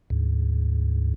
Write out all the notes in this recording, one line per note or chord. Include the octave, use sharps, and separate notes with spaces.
D2 G#2